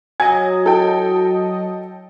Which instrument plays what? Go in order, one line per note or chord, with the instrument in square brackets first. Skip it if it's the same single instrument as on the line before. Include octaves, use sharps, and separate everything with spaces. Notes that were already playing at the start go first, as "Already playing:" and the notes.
[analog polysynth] F#3 D#5 [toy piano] G#5 [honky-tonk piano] G#6
[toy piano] E4 [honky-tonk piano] A4 G5